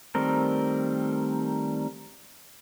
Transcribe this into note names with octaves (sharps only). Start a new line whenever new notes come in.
D#3 G3 A3 C4 A#4